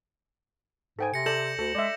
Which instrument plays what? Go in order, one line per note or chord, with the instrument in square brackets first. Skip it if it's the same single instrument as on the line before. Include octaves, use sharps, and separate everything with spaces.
[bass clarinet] G#2 [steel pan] A4 G5 G#5
[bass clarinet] C3 [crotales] A#6 C#7
[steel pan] A4 D5 [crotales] G6 E7 F#7
[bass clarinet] D2 [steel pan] A4
[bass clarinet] G#3 [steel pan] D5 E5